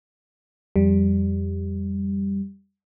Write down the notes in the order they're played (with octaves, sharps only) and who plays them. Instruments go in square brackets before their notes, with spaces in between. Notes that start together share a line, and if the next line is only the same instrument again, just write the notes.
[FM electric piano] F2 G3